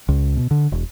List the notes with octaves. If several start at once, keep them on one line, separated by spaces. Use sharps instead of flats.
C#2
B2
D3
E1